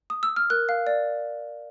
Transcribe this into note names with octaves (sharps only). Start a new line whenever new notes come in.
D#6
E6
F6
A#4 F#6
F5
D5